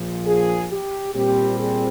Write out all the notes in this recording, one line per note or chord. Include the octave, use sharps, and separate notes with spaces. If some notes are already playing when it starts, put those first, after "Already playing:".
Already playing: A#1 A#2 F3
G#4
G4
A#2 G3 C4 G4
G#4